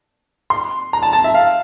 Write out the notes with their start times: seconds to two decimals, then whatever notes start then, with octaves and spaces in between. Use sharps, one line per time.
0.50 C6
0.93 A#5
1.03 A5
1.13 A5
1.24 E5
1.34 F5